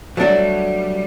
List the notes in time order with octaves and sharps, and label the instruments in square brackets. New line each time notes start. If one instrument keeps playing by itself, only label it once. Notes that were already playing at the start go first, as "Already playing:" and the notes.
[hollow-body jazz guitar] F#3 A3 D4 F#4 [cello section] G3